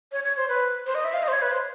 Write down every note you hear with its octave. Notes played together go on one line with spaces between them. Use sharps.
C#5
C#5
C5
B4
C5
D#5
E5
F5
D#5
C5
C#5
B4
C5